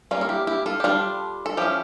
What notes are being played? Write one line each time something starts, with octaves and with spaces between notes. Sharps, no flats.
G3 A#3 C#4 F4
A4
E4 G4
E4 G4
F4 A4
G4
G3 D4 F4 A4
A4
F3 C#4 E4 G4